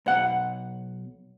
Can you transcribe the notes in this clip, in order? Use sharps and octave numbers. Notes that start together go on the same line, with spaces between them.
B1 F#5